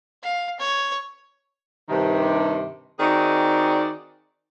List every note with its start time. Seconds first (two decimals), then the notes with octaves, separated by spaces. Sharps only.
0.22 F5
0.60 C#5
1.89 G2 C3 D#3
3.00 D#3 C4 D#4 F#4 G#4 D5